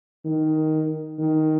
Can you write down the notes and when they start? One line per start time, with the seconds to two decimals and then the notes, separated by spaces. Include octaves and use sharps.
0.25 D#3
1.18 D#3